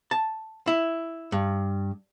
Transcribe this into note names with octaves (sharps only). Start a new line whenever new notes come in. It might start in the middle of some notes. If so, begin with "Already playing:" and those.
A5
E4
G2